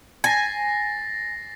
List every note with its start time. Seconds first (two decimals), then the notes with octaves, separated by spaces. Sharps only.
0.24 G#5 A6 A#6 C7